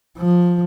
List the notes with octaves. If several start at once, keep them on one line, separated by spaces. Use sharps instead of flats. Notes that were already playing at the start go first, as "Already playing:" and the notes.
F3